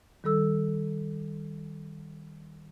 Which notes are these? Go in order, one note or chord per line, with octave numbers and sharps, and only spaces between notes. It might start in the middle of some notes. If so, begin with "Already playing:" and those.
D#3 G3 A4 E6